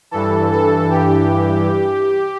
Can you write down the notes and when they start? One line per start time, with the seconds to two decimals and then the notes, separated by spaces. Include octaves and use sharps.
0.11 G2 E3 A4
0.51 A4
0.90 G4